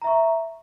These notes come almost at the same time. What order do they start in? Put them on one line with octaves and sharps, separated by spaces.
A#5 E5 C#6